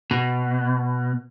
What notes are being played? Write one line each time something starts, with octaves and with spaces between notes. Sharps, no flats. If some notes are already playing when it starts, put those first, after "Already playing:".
B2